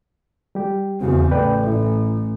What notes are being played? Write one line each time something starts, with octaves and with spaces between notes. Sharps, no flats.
G3 G4
E2 C#3 C4 F#4
A1 B4 D5 G5
A2 E4